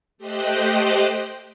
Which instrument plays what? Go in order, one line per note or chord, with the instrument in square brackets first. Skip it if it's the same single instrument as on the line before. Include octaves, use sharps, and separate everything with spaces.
[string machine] A3 G4 C5 D#5 G5 F#6